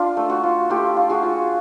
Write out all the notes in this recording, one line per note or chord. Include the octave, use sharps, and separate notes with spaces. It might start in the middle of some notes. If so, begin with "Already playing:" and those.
Already playing: D4 F4
A3
F#4
F4
A3 F4 G4
F4
F#4 G#4
F4